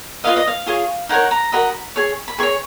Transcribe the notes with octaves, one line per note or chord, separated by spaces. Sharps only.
F4 B4 D#5 F5
D#5
F5
F4 G#4 C#5
D#4 A#4 C#5 F#5
A#5
F#4 A#4 D#5 B5
G#4 C#5
B5
G#4 C#5 C#6